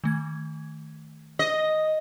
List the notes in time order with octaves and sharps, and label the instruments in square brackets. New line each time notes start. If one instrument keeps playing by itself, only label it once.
[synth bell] D#3 A3 G#6
[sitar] D#5